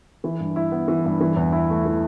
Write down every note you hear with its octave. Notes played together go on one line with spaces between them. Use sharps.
E3
G2
E4
B3
E3
G2
E3
E2
E4
A3
E3